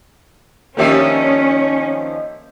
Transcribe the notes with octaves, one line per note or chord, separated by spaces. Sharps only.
D#3 F3 A#3 C#4 D4 G4 E5